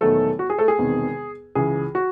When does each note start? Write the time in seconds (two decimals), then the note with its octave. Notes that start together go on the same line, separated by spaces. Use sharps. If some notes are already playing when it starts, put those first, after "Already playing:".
0.01 E1 E2 D#3 F#3 A3 A4
0.39 F#4
0.50 G#4
0.59 A3 A4
0.68 G#4
0.78 E1 E2 C3 D#3
1.55 C#2 C#3 E3 G#4
1.95 F#4